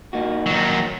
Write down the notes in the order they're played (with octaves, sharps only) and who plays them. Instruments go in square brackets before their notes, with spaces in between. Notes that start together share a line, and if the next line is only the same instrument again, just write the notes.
[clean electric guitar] A#3 D#4 F#4
[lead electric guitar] D#3 F#3